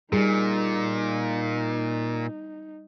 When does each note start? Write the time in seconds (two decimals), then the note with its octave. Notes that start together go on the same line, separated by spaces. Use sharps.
0.12 A#2 G3 D#4 G#4